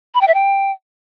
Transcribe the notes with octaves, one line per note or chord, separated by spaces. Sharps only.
B5
G5
E5
G5